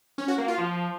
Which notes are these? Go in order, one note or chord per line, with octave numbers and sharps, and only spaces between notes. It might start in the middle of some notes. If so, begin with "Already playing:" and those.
C#4
F#4
A#3
F4
F3